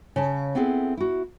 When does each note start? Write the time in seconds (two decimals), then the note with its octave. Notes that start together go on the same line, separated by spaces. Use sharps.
0.16 C#3 C#5 A5
0.55 B3 C4 E4 G#4 A4
0.97 E4 F#4